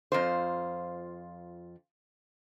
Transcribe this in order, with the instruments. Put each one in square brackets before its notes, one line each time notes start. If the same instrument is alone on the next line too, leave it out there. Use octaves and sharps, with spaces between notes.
[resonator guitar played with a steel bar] F2 F4 C5